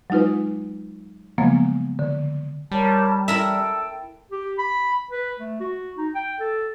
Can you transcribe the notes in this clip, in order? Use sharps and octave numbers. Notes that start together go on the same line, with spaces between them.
F#3 G#3 D#4 F4 B4
C#3 F3 F#3 G#3 A#3 B3
D3
G3 A#4 C#5 A5
E4 A4 A#4 E5 G5
G4
B5
B4
A3
F#4
D#4
G5
A4